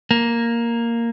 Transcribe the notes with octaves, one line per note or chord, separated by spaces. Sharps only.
A#3